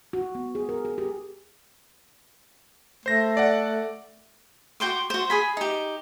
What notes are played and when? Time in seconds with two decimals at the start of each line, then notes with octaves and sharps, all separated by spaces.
0.13 F#4
0.35 B3
0.55 G#4
0.69 A#4
0.85 G#4
0.98 G4
3.06 A3 C5 A#6
3.37 D5 F#5
4.80 F#4 G5 C6 D6
5.10 F#4 C5
5.30 G#4 G#5 B5
5.57 D#4 G4